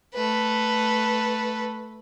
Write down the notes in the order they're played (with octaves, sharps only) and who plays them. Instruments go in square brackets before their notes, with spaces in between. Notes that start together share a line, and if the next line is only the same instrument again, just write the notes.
[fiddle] A3 B4